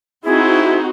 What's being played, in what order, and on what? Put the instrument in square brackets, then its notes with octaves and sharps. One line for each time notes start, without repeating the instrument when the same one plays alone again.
[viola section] C4 D#4 F#4 [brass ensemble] E4 [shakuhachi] G#4